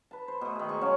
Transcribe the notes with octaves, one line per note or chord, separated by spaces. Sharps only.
B4 A5
C5
B2 A3
D#3 G#4
G#3 C5 C#6
C#3 F#3 C#4